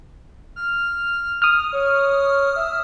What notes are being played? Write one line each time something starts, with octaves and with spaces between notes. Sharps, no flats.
F6
D#6 F6
C#5
E5